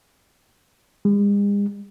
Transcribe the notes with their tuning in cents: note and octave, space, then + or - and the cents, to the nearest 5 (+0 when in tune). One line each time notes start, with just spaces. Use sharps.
G#3 -45